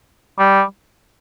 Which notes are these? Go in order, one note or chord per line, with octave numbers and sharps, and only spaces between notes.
G3